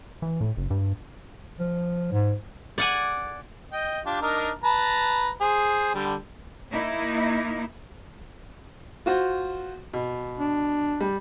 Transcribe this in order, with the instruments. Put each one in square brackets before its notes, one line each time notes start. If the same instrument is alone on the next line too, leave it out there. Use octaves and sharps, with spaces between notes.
[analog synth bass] E3
A2
F#1
G2
[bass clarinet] F3
G#2
[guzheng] D5 F#5 G#5
[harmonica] D#5 G5
D4 F4 G4
D4 D#4 A#4
B4 A5 A#5
G#4 C5
D3 G3
[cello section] A#3 D#4 E4
[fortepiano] F4 F#4 C5
B2
[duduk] D4
[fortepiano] G3